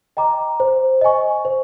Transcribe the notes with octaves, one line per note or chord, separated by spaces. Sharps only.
D#5 G5 A#5 D6
C5
D#5 G#5 C#6
C5